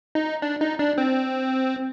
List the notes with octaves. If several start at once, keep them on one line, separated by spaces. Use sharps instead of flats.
D#4
D4
D#4
D4
C4